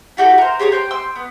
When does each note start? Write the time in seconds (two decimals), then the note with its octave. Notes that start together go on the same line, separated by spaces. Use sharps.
0.17 E4 F#4 G4 A4
0.38 A#4 C5
0.59 G4 G#4 C#5 A#5
0.72 C5 G5 F#6
0.91 G5 C6 E6
1.16 B3